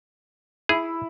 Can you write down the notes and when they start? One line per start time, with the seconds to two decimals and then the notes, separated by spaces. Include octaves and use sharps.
0.69 E4 G#4